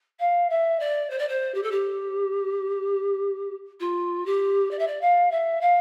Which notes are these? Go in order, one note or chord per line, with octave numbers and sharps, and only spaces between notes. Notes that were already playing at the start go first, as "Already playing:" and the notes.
F5
E5
D5
C5
D5
C5
G4
A4
G4
F4
G4
D5
E5
D5
F5
E5
F5